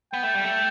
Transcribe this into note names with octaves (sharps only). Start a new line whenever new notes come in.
B3 G5
A3
G3
A3